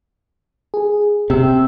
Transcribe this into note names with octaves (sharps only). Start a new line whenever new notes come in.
G#4
C3 G5 E6